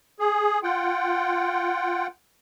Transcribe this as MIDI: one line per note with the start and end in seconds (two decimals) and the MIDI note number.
0.20 0.59 68
0.63 2.07 65
0.63 2.07 78
0.63 2.07 79